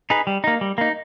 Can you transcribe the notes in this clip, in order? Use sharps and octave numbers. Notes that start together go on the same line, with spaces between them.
D#4 G#4 B4
G3
A#3 D#4
G3
A#3 D#4